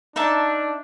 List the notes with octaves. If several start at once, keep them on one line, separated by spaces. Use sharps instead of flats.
D4 D#4 E5 A5